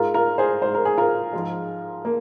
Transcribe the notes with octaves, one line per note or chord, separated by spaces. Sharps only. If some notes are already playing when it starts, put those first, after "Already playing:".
Already playing: G#2 G#3 F4 A#4
F4 A#4
G#4 C5
G#2 G#3 C5
A#4
G#4
F4 A#4
G#2 F3 G#3
A#3